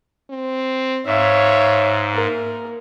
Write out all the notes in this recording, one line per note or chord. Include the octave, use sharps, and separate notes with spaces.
C4
G#2 C#5 E5 F5
A#3 A#4